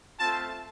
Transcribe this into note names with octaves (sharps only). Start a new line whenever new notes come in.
A3 C4 F4 A5